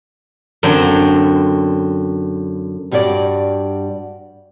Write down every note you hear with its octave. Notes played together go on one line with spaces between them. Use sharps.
F#2 D3 C4
G2 G3 F#4 G4 D5